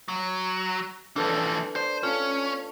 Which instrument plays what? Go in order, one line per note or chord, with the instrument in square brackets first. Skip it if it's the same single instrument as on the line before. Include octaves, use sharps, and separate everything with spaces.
[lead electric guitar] F#3
[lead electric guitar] E3 F3 [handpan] D4 A4 B4
[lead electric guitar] C5 [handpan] D5
[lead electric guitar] C#4 [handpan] F4 A4